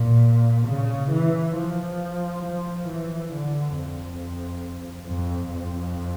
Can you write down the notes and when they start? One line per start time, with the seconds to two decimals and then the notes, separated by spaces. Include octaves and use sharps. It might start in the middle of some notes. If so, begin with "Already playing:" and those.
Already playing: A#2
0.67 C#3
1.11 E3
1.55 F3
2.43 F3
2.88 E3
3.32 D3
3.76 F2
5.08 F2
5.53 F2